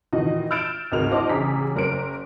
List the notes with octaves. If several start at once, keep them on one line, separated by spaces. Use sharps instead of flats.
A#2 D#3 E3 F#4 D#5
E6 F6 G6 A6 D7 E7
G#1 D2 G#2 A#4 F6 F7
D4 E4 F#4 C5 D#5 D6
A1 C#3 G#4 A#5 B6
F#1 A#4 C5 D7